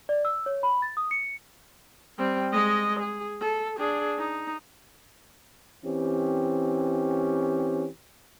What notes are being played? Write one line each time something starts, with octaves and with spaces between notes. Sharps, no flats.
D5
E6
C#5
B5
A6
D#6
C#7
G3 C4
G#3 D#5
G#4
A4
D4 G#4
D#4
E3 C4 C#4 G4